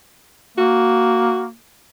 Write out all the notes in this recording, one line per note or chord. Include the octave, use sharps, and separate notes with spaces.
A#3 F#4